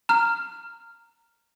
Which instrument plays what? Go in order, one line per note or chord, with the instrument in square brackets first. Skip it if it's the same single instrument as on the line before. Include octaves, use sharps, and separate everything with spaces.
[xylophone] A#5 F6